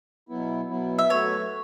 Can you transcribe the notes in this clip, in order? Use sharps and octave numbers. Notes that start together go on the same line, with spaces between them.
B2 F#3 B3 E4
B2 F#3 B3 E4
E5
F#3 A3 F#4 B4 C#5 E5